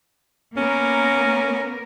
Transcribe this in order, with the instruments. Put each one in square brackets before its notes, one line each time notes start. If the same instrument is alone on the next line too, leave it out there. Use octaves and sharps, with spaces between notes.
[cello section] A#3 B3 A#4 [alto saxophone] C#4